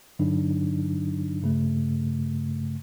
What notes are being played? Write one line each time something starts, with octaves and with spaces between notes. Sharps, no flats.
G2 D3 F#3 D4 D#4
G2 C#3 A3